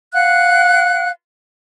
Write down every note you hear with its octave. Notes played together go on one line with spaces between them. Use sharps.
F5 F#5 F#6